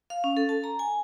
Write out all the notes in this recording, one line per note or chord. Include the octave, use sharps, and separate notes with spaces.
F5
C#4
A4
A5
A#5
G#5